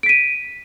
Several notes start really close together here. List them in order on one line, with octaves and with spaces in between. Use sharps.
D7 B6 D#7